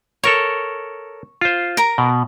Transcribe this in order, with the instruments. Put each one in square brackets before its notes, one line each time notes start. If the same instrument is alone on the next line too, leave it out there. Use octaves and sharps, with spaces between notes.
[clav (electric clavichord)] A4 A#4 C#5 [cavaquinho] C#6
[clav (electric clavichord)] F4 C5
[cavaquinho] A#4 A#5
[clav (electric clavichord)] B2